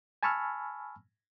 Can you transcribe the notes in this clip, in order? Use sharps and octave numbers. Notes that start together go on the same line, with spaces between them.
G#5 A5 B5 C#6 E6 F6